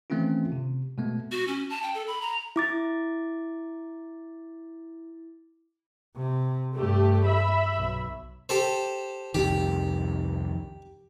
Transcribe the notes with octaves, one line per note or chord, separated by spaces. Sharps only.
D#3 E3 A3 C4 C#4 F4
C3
B2 G#3 A3 B3
F#4
C#4
A5
G5
A4
B5
A#5
E4 D6 A6
C3
G2 A3 G4
E5 B5
B1
G4 A4 C5
C2 F2 D#3 G4